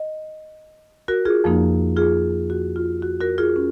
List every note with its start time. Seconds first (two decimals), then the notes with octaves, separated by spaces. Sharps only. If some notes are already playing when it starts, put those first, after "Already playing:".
Already playing: D#5
1.08 F#4 A#4
1.25 F4 G#4
1.44 F2 F3 A#3 D#4
1.97 F4 G#4
2.50 F#4
2.76 F4
3.02 F#4
3.21 F#4 A#4
3.38 F4 G#4
3.56 C#4